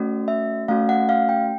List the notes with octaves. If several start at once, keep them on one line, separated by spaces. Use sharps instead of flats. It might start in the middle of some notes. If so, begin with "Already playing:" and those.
Already playing: A3 C#4 F#4
E5
A3 C#4 F#4 F5
F#5
F5
G5